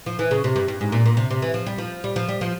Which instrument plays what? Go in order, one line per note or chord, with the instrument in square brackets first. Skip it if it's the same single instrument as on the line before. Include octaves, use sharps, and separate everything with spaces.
[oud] F3
E3
C#3
C3
G2
G2
G#2
A#2
A#2
C3
C3
E3
F3
G3
F3
G3
F3
G3
F3